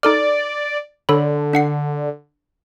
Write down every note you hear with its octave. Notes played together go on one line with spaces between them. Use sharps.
D#4 A4 D5 F6
D3 A4 C#5 B5
D4 F#5 C7